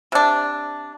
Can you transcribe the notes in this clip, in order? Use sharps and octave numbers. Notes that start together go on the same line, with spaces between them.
C3 D4